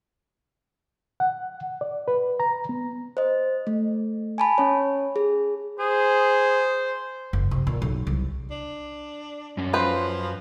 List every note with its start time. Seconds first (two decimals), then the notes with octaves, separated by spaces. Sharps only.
1.20 F#5
1.81 D5
2.08 B4
2.40 A#5
2.69 B3
3.17 C5 D#5
3.67 A3
4.38 G#5 A5 B5
4.58 C#4 C#5
5.16 G#4
5.79 G#4 C5
7.33 F#1
7.51 C3
7.67 A#2
7.82 B1
8.07 C2
8.51 D4
9.57 F#2 C#4
9.73 F3 F4 B4 C5